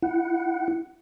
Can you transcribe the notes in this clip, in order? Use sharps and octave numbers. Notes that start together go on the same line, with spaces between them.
E4 F#5